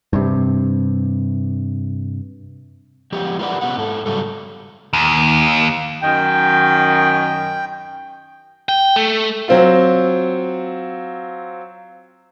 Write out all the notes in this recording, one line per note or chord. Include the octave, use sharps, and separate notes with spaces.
G2 C3
F3 G#3 B3 G4
F4 A#4 B4 D5 F#5
C3 D#3 B3 C#4 B4 F#5
G#2 A4
C#3 F#3 G3 A4
D#2
F#2 D#3 G5
G5
A3
F#3 C4 F4